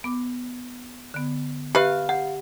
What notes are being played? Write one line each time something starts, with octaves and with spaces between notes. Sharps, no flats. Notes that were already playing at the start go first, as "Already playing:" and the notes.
B3 D6
D3 B3
G4 B4 E5 F5
G4 F#5